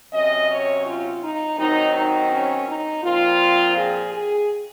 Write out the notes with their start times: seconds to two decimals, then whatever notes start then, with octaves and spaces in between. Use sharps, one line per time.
0.13 C3 F#3 C#4 D#5
0.49 C#5
0.86 F4
1.22 D#4
1.59 D#3 F#3 C4 D#4
1.95 D#4
2.32 C#4
2.67 D#4
3.04 A#2 F3 C4 F4
3.77 G#4
4.13 G#4